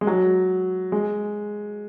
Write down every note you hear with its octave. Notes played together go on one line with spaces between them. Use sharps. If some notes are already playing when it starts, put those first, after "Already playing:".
G#3
F#3
G#3